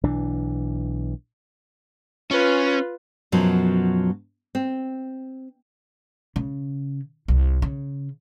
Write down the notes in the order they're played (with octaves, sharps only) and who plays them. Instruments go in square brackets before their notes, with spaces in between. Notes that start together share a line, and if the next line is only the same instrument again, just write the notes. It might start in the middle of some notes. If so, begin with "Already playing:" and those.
[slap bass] B1 E3 D4
[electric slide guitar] C#4 [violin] F4 B4
[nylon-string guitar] F#2 B2 F3 F#3
C4
[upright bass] C#3
C2
C#3